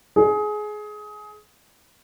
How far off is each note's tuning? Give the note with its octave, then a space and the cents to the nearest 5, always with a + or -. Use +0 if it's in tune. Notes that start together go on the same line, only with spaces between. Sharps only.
G#4 +20